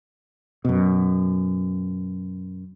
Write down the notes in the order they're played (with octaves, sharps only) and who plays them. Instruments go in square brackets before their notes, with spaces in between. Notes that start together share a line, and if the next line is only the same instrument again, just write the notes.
[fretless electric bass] F#2 B2